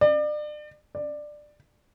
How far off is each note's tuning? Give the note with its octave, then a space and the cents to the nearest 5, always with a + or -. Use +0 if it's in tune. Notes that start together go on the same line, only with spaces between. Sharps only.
D5 +35
D5 +15